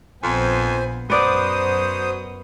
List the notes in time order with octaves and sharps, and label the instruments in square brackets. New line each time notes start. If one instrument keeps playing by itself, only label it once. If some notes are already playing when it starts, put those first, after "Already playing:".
[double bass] A#1 B3 [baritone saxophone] F2 [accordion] C5 G#5
[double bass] F#2 [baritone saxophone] F#3 [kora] B3 D5 [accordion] C5 D#6